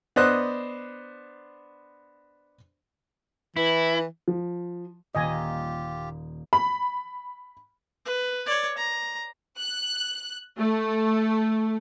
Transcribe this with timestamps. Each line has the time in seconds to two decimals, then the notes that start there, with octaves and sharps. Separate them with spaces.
0.16 B3 D4 C5 D#5 F#6
3.57 E3 E4
4.28 F3
5.15 D#1 A#3 F4 G4 D#5 G#5 G6
6.53 B5
8.05 B4
8.46 C#5 D5
8.77 A#5
9.58 F#6
10.57 A3